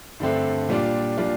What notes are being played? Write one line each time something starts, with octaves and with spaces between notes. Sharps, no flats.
G2 D3 A3 C4
A#2 G3 D4 F4
A#2 G3 D4 F4